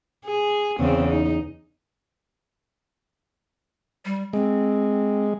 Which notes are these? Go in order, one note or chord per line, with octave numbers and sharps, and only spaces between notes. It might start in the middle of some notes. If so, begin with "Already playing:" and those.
G#4
E2 C#3 C4
D#4
G3
G#3 C4